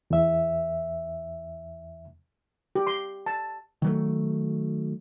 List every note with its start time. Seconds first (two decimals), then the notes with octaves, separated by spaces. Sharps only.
0.10 E2 E5
2.75 G4
2.87 C6
3.26 A5
3.82 D#3 F#3 A3